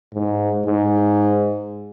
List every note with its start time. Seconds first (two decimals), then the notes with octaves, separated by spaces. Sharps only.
0.14 G#2
0.66 G#2